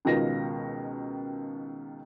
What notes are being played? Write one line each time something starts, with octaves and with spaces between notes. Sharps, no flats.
C#2 B2 D#3 F4 A#6